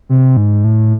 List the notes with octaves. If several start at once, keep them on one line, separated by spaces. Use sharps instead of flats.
C3
G#2
A2